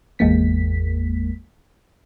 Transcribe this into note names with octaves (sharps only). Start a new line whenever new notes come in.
G#1 E2 G#3 A#3 B6